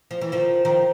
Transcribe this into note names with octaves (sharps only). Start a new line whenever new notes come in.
F3
E3
D#3 F3
D#3 F3